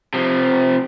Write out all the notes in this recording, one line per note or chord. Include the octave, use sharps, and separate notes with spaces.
C3 F3